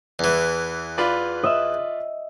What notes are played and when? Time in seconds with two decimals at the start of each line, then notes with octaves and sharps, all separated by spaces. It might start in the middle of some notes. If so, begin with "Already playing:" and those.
0.19 E2 E3
0.98 F4 B4 D5
1.43 D#5 E5 E6